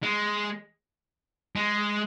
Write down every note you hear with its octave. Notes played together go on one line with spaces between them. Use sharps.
G#3
G#3